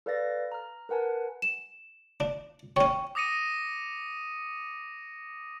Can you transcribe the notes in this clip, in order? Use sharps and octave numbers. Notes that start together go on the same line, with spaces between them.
A4 B4 D5 F5 A6 A#6
A#5 F6
A#4 B4 F#5 G#5 A5
E7
D4
C#4 C#5 G5 C#6
D6 D#6 A#6 C#7 D#7